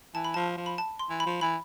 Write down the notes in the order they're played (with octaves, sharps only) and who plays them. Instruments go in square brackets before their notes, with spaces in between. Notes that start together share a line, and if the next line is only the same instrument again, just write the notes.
[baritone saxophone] E3 [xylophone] A5
[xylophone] B5
[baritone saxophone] F3 [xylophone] A5
[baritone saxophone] F3
[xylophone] B5
A5
C6
[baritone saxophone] E3
[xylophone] B5
[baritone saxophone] F3
[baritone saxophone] E3 [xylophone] B5